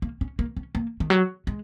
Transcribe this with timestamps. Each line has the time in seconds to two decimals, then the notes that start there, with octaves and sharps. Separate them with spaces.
0.02 A#3
0.21 C#4
0.39 A#3
0.57 C#4
0.75 A#3
1.00 D#3
1.10 F#3
1.47 G#3